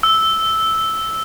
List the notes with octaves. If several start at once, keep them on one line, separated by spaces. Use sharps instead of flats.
E6